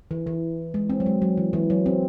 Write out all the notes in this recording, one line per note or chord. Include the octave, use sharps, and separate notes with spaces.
E3
E3
G#3
C4
F#3
G#3
F#3
E3
E3
F#3
C4